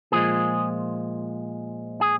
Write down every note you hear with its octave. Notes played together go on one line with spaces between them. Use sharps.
A#2 F3 G#3 G#4
G#4